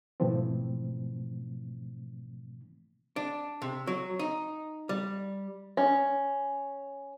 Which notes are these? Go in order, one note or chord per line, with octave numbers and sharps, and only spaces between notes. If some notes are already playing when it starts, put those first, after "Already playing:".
G#2 B2 E3 F3 A3 C4
D4
C3
F#3
D#4
G3
C#4